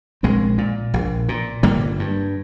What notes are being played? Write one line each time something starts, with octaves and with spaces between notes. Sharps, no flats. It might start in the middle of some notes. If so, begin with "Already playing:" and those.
A#1 G#3 C4
A#2
A#1
A#2
G1 G3 A#3
G2